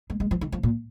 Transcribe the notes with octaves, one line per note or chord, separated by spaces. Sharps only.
G#3
G#3
F3
D#3
F3
A#2